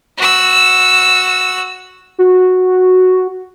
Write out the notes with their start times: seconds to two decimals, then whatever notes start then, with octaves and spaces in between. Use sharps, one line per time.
0.18 F#4 E6
2.19 F#4